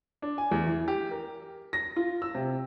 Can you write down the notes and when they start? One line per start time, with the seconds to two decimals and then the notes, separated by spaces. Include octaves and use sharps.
0.22 D4
0.38 G#5
0.51 E2
0.66 E3
0.88 G4
1.11 A#4
1.73 A#6
1.96 F4
2.22 E6
2.35 C3